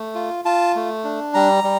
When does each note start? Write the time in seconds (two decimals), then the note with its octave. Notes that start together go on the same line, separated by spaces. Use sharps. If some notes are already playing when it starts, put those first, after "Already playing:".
Already playing: A3
0.15 F4
0.45 F4 A5
0.75 A3
1.04 D4
1.34 G3 A#5
1.64 G3